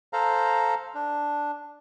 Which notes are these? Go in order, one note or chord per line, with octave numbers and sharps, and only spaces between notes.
A4 C5 F5 A#5
D4